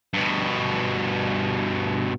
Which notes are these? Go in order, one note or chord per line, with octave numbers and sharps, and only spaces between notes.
G2 B2